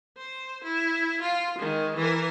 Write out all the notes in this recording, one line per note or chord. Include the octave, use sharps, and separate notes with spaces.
C5
E4
F4
D#3 G#3
E3 A#4